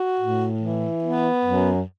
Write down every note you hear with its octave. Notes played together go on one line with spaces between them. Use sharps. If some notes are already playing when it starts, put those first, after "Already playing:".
Already playing: F#4
A2
E3
B3
F#2